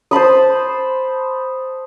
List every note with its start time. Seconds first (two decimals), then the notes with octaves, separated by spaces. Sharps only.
0.11 C5 A5 B5 D#6